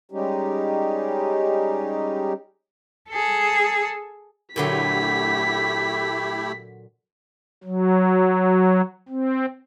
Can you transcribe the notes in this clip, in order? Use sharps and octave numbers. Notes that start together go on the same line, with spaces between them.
G3 G#3 C#4 D#4 G4
G#4 A4
A#2 D3 F#3 A3 E4 G4 B6
F#3
C4